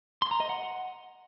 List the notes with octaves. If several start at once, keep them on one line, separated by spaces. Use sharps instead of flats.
C6
A#5
D#5
F#5